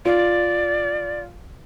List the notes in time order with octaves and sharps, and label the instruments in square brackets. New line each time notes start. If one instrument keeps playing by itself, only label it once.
[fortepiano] F4 [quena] D5